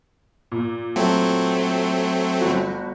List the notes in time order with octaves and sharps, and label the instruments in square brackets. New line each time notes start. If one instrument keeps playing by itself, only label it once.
[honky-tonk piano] A#2
[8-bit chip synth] F#3 A3 C4
[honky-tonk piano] G1 C#4 F#4